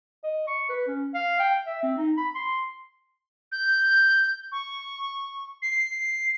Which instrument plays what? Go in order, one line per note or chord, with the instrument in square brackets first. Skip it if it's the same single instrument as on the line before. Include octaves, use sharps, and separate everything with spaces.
[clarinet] D#5
C#6
B4
C#4
F5
G5
E5
C4
D#4
B5
C6
[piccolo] G6
C#6
C7